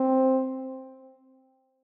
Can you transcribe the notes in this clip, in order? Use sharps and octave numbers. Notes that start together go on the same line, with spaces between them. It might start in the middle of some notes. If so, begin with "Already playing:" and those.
Already playing: C4